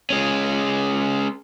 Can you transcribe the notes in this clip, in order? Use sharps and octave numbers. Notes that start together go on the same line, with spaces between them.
G#3 C#4